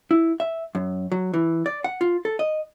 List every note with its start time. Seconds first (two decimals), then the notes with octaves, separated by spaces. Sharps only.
0.11 E4
0.40 E5
0.75 F#2
1.12 F#3
1.34 E3
1.66 D5
1.84 F#5
2.01 F4
2.25 A4
2.39 D#5